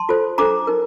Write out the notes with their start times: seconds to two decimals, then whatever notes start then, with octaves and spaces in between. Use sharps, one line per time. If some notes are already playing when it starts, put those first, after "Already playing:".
Already playing: A5 C6
0.09 F4 A4 C5
0.38 D4 A4 C5 A#5 D6
0.67 D#4 A#4